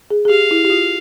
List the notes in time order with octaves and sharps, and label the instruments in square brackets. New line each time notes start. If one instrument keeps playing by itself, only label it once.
[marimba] G#4
G#4
[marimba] G4 [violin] F5
[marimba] E4
G4
F4